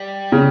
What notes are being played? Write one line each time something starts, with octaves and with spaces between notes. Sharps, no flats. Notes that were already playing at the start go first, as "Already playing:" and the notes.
Already playing: G3
C#3